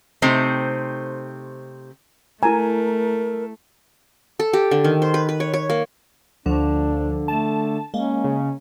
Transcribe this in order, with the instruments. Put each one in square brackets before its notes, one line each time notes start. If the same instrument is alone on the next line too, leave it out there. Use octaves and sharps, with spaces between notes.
[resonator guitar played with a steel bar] C3 A3 C4 D#4 C5
[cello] A3 [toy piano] E4 A#5 [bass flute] A#4 [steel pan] G#5
[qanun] A4
G4
D3
D#3
C5
B4
B4
C#5
C#5
A#3
[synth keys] D2 F3 [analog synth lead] D3 [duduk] D4
[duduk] A3 [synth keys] A5
[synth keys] G#3 A#3 [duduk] C#4
[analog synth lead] C#3